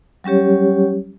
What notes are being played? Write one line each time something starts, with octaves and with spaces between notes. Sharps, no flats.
F#3 G3 C#4 G4 C#5